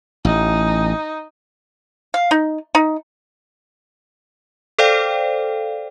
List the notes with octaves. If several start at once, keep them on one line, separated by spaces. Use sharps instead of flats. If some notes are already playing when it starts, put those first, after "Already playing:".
A1 D#4
F5
D#4
D#4
A4 C5 D5 F5 G5